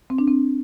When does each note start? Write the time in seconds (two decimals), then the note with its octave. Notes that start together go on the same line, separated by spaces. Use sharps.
0.10 C4
0.18 D4
0.28 C4